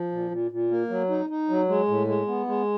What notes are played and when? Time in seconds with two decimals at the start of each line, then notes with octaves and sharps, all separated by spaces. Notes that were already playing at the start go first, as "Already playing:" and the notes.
Already playing: F3
0.11 A#2
0.31 A#2
0.51 A#2
0.71 A#3
0.89 F#3
1.10 D#4
1.30 D#4
1.49 F#3
1.69 G#3
1.88 A2
2.08 G#3
2.28 B3
2.47 G#3